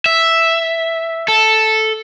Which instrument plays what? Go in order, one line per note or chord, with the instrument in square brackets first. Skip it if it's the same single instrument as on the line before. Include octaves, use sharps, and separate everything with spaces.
[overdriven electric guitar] E5
A4